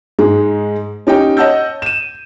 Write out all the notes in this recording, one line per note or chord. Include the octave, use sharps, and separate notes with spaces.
G#2 G#3
C#4 D#4 G4 G5
C#5 D#5 F#5 A5 E6 G6
D#7 E7